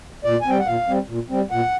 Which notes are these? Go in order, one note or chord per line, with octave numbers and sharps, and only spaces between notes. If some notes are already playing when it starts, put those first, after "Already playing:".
A#2 D5
G#5
G3 C4 G5
F#5
A#2 F5
G3 C4
A#2
G3 C4
A#2 F#5